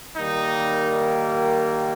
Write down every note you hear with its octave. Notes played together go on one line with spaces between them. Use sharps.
D#3 G3 A#3 D#4